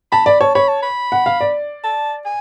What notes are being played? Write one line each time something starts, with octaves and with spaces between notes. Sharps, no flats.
A5 B5
D5 B5
C#5 A5
C#5 B5
A5
B5
F#5
F5
D5
A5
G#5